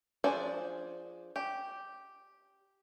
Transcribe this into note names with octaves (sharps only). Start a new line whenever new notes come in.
F3 D4 G#4 C5 D5
G4